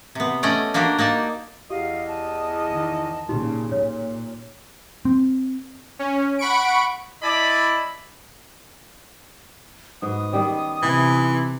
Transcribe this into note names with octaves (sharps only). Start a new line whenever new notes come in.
C3 B3
A3 C#4 D5 D#5 F#5 G5
A#3 D4 F#4 G4 A#4
A#3 D#4 D5 A5
E2 G4 D#5 F5
A5
D#3
A#2 C#3 D#4 G4 C6
A#2 C#5
C4
C#4
F#5 B5 C#6 D7
E4 D5 D#5 A5 B5
G#2 B3 F#4 D#6
D#3 G3 C#4
C3 E3 E4